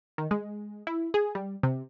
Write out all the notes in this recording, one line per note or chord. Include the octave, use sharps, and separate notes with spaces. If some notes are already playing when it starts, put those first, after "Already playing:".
D#3
G#3
E4
G#4
G3
C3